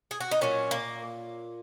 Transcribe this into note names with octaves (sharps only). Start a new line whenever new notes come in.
G#4
F#4
D#4
A#2 F#3 C#4
A#3